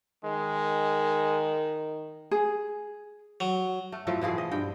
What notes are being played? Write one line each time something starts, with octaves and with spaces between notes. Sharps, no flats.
D#3 G#3
G#4
F#3
A3
A2 F3 F#3 A3
B2 E3 F3 G#4
D#5
G2 G5